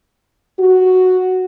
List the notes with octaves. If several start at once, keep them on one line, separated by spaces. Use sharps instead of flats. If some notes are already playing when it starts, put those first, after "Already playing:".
F#4